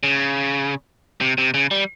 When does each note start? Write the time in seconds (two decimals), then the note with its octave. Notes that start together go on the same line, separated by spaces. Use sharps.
0.03 C#3
1.21 C3
1.38 C3
1.54 C#3
1.71 G3